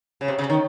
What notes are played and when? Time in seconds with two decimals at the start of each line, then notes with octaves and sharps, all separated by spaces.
0.21 C#3
0.28 C3
0.39 C#3
0.50 D#3